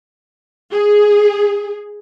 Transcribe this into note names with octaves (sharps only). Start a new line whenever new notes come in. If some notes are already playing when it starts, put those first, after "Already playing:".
G#4